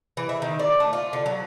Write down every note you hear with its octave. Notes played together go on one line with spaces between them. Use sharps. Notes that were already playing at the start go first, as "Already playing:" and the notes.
E3
E5
D#3
D5
A3
F4
D3
F#3